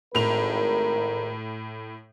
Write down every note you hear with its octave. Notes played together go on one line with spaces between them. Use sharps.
G#1 A2 A#4 F7